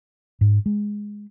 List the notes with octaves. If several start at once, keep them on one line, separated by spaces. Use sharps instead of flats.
G#2
G#3